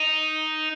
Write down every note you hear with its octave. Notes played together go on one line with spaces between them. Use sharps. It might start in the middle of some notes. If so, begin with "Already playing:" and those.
Already playing: D#4